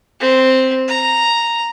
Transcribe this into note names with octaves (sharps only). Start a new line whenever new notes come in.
C4
A#5